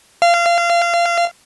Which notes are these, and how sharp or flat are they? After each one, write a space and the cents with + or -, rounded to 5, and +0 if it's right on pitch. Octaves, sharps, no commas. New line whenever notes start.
F5 -25